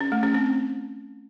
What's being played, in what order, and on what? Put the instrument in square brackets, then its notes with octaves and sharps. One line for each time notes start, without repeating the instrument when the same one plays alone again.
[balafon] C#4
A3
C#4
C4